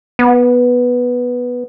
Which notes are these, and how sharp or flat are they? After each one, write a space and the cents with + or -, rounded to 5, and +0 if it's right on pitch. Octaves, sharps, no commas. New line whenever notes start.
B3 -5